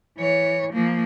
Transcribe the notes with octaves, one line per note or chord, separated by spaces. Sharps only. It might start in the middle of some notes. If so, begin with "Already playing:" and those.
E3 C#5
F3 A#3